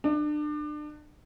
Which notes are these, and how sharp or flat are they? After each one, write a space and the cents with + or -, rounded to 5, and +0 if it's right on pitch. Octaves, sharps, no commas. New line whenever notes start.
D4 +30